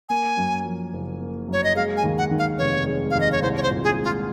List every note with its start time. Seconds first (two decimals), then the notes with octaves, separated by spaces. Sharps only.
0.09 A#3 G#5
0.37 F#2
0.65 F3
0.93 F#1
1.20 A#3
1.48 F#2 C#5
1.64 D#5
1.76 G#3 F5
1.97 G#5
2.04 D#2
2.18 F#5
2.31 D#3
2.39 F5
2.58 F1 C#5
2.86 G#3
3.11 D#2 F5
3.20 D#5
3.32 C#5
3.42 C2 C5
3.57 C#5
3.63 C5
3.70 A#2
3.84 G#4
3.98 G#3
4.04 F4